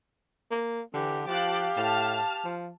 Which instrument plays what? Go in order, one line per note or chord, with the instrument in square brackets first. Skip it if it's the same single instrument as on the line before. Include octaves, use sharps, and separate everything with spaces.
[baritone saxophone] A#3
[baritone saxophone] D3 [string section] E3 [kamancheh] G4
[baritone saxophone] F3 [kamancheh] G4 F5 [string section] A5 D6 F#6
[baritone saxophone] A2 [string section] A5 F6
[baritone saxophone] F3